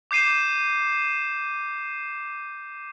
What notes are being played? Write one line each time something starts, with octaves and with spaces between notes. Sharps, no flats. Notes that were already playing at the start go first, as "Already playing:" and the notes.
D6 G6 C7 D#7 E7